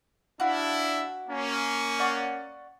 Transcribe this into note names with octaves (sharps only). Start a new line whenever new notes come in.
D4 E4 F#4 F5
A#3 C#4
D5 F#5 C#6